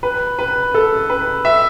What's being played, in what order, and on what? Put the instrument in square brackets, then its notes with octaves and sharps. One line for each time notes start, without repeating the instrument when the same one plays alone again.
[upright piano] B4
B4
A4
B4
E5